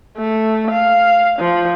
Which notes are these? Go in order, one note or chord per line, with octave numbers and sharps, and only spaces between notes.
A3
F5
F3